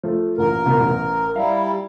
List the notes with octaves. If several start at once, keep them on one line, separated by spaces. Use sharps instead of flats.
F3 A3
A1 A#2 A#4
C2 B2
A1
G3 E4 F5 A#5